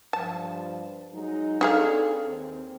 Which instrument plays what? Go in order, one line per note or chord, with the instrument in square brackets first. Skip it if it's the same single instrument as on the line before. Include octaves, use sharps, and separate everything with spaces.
[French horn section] G2 F3 [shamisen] A5
[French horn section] F#3 G#3 D#4
[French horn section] C4 D4 A4 [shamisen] D#4 G#4 F5
[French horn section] D#2 C4